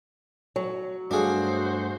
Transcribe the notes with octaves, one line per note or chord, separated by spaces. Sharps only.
F#3
G2 A3 D4 F#4 G#4 C5 F5